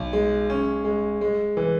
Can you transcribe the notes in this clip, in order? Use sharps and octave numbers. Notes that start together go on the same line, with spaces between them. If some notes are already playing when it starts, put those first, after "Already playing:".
Already playing: B1
G#3
C#4
G#3
G#3
E3